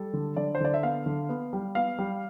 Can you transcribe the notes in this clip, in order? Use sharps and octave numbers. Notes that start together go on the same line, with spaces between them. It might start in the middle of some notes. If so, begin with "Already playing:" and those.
Already playing: G3 A4
D3
D3 D5
C5
D3 D5
E5
B3 F5
D3
B3
G3
B3 F5
G3